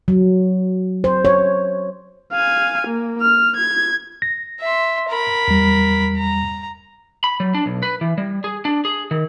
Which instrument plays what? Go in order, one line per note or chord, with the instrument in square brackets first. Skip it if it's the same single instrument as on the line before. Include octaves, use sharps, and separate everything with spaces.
[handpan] F#3
C5
C#5
[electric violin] F5 G#5
A#3
F6
G#6
[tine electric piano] A#6
[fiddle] E5 C6
A#4 B5
[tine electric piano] E2 G3
[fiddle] A#5
[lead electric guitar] B5
F#3
D4
B1
B4
E3
G3
G#4
D4
G#4
D#3